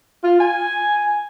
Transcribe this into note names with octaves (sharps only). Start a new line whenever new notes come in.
F4
G#5